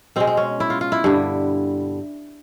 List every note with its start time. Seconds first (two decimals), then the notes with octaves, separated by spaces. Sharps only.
0.16 B2 G#3 C4
0.27 C4
0.37 C#4
0.60 E4
0.70 F4
0.81 F4
0.92 E4
1.04 G2 D3 G3